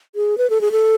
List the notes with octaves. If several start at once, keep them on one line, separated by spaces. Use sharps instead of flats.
G#4
B4
A4
G#4
A4